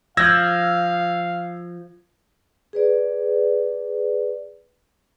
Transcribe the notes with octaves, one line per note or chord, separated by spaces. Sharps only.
F3 F5 E6 G#6 A#6
G#4 B4 D5